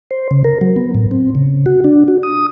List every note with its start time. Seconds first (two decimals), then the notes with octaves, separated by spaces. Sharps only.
0.11 C5
0.31 C#3
0.44 A#4
0.61 F#3
0.76 B3
0.95 A2
1.11 C4
1.35 C#3
1.66 F#4
1.84 D4
2.08 F#4
2.23 D#6